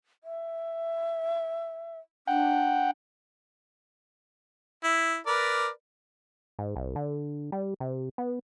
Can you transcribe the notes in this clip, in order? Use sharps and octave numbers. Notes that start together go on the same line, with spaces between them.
E5
D4 F#5 G5
E4
A#4 B4 D5
G#2
C2
D3
G3
C3
B3